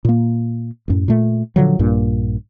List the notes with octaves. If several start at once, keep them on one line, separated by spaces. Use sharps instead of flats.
A#2 A#3
A1 F#2 A2
A#2 A3
A#2 D3 F3 F#3
A#1 G2 A#2